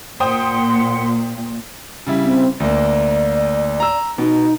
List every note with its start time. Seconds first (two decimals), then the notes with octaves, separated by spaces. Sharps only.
0.20 A#2 C5 F#5 G5 C6 D#6
2.07 C#3 G3 E4
2.22 C4
2.60 D2 A#3 D5
3.80 A#5 E6
4.18 B2 D#4